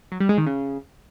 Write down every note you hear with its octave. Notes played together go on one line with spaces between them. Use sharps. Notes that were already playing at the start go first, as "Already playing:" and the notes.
F#3
G3
G#3
D#3
C#3